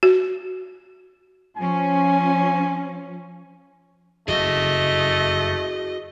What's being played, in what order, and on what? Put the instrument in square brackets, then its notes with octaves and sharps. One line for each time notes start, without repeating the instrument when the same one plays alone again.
[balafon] F#4
[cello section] F3 C#4 [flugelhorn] G#5
[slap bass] F#1 F2 C#3 [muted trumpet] A3 [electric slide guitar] F#4 G#4 [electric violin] D#5